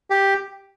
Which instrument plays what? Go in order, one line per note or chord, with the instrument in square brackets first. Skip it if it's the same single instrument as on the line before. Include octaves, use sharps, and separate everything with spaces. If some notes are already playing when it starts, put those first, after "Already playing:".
[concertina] G4